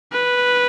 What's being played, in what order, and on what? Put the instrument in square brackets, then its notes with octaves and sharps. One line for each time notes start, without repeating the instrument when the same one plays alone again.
[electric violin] B4